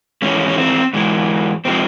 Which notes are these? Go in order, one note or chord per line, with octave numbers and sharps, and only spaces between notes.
G#2 E3 G#3 C#4
C#4
C4
G#2 E3 G#3
C3 F3 G#3 C4